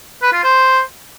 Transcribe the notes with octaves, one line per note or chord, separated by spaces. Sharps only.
B4
F4
C5